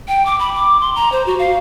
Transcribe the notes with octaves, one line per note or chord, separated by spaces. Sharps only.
G5
D6
B5
D6
C6
A#5
C5
F#4
F5